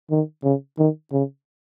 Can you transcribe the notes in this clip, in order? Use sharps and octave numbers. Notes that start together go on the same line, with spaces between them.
D#3
C#3
D#3
C#3